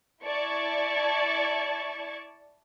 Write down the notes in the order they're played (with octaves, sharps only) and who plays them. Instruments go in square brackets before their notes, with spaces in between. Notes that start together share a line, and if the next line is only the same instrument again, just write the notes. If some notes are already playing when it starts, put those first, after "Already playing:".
[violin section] E4 D5 A5 C#6 G#6